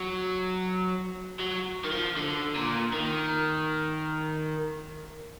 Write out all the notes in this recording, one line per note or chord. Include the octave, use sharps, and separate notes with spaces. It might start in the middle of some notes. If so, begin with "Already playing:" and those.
Already playing: F#3
F#3
D#3
F3
D3
A#2
D#3